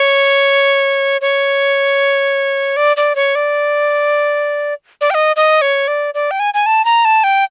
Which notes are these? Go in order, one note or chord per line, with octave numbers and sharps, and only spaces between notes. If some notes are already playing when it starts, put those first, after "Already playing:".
Already playing: C#5
C#5
D5
D5
C#5
D5
D5
G5
D#5
D#5
C#5
D5
D5
G5
G#5
G#5
A5
A#5
A5
G5